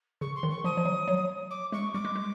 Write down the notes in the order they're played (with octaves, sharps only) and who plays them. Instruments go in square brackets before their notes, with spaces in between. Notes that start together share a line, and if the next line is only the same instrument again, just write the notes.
[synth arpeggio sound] C#3 [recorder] C#6
[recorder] C6
[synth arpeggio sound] D#3
[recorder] C#6
[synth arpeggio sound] F3 [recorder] D#6
[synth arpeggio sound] F3
F#3
F#3
[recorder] D6
[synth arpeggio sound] G#3 [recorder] C#6
[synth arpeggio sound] G3 [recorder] D6
[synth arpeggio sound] G#3
G#3